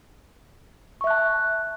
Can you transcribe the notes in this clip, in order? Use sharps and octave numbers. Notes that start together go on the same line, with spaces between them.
E5 A5 C#6 F#6